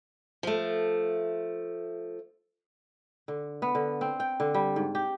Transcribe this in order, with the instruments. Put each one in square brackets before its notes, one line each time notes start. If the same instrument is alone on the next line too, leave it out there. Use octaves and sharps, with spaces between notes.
[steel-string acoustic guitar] F3 A3
[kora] D3
B3
D3
C4
G5
D3
G3
G#2
G4